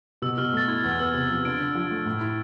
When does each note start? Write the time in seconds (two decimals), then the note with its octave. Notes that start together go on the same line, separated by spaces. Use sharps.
0.22 B2 E6
0.38 B2 F6
0.53 A3 A6
0.68 E4 G#6
0.84 E2 G#6
0.92 F6
0.99 B3 E6
1.07 F6
1.14 C3
1.30 F3
1.45 D3 D7
1.60 D3
1.75 F3
1.91 A3
2.06 A2
2.21 E4